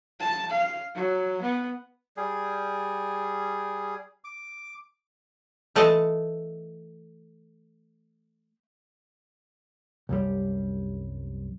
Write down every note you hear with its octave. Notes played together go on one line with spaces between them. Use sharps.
A5
F5
F#3
B3
G3 G#4
D6
E3 A3 A4 D#5 A5
C2 F#2 G3